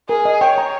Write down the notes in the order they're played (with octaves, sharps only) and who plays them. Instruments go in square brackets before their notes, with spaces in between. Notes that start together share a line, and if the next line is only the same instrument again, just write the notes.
[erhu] G#4 [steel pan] A#4
[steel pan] D#5
[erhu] C#5 [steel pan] G5
[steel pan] A#5